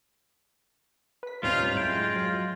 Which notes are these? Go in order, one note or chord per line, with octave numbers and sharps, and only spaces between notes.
B4 B6
D#2 A2 C3 G3 C#4 D#4 F4
F#2 A2 G#3 E4 F4 G5
F#3